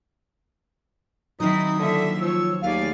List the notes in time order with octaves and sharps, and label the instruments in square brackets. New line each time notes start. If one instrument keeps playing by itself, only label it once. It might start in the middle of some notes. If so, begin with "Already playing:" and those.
[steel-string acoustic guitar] D#3 F#3 [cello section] C4 E4 [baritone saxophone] D#4 [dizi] D#6
[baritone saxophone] D3 [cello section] F3 A#3 E5
[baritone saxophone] F3 [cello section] C#5 [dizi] E6
[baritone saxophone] D#2 [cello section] A3 G#4 D5 [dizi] F5